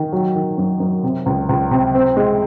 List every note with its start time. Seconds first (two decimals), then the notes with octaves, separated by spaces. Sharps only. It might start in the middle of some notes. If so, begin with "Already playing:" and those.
Already playing: D#3
0.13 F#3
0.35 D#3
0.58 F#2
0.80 F#2
1.03 C3
1.26 C#2
1.49 C#2
1.71 C3
1.95 C4
2.17 G#3